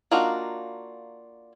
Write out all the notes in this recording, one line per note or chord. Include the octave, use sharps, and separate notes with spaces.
A#3 D4 D#4 F4 F#4